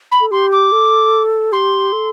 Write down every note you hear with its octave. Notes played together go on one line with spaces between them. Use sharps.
B5
A4
G4 C6
D6
A4
G4 C6
A4